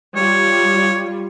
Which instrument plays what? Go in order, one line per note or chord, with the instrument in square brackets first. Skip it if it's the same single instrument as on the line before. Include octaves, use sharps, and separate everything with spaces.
[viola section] G3 F4 [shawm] C#5